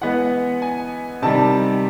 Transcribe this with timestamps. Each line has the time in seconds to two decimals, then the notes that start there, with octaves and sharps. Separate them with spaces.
0.01 E3 G#3 B3 F#5
0.62 G#5
1.22 C3 D#3 G3 A5